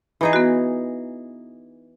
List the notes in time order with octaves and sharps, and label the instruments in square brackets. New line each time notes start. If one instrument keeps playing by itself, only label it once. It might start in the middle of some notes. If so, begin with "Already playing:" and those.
[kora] E3 D#4 G#4
[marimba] B3 F#4